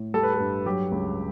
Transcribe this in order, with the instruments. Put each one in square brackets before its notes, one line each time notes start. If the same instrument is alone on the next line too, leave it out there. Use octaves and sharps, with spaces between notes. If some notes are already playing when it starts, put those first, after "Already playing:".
Already playing: [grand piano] A2
G3 A4
B4
A4
G2
F#3 G4
C#2